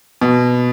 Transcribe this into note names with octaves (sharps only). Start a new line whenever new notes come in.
B2